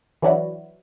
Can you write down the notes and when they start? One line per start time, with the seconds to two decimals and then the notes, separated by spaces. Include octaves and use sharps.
0.22 E3 F#3 D4 E4 F#4